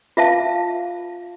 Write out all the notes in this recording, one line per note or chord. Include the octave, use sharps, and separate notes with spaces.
F4 E5 F5 A5